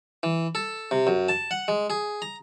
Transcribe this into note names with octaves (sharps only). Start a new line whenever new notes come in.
E3
A4
C3
F#2
A5
F#5
G#3
G#4
A#5